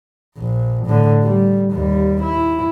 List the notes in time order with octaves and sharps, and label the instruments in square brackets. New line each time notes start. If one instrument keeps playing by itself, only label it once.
[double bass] A#1
A2 D3
G3
D#2 G3
E4